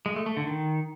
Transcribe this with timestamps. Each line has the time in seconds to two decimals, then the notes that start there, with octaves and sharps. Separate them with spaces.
0.06 G#3
0.16 A3
0.26 A3
0.37 D3
0.47 D#3